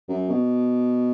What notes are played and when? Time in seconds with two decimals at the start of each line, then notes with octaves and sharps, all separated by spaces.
0.09 F#2
0.29 B2